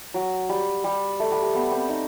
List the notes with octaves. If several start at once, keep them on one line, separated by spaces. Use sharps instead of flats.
F#3
G3
G3
A3
G3
G3
B3
C4
D#4